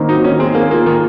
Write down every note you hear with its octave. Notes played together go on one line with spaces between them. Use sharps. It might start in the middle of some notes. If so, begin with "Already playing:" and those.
Already playing: D#3 A#3 C4
F#3 D#4
D#3 C#4
C4 G#4
A#3 G#4
A#3 F4
D#3 A#3